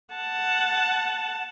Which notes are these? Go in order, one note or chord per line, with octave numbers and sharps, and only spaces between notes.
F#5 A5